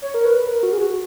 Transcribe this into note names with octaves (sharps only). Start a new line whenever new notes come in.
C#5
A#4
B4
A#4
F#4
G#4
F#4